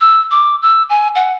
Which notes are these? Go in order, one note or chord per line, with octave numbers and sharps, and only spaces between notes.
E6
D6
E6
G#5
F#5